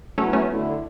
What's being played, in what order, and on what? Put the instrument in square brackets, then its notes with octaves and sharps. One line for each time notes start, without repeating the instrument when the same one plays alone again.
[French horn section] F#3 B3 E4 [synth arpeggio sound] A3 C#4
[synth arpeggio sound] A3 C#4
[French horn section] D3 A3 E4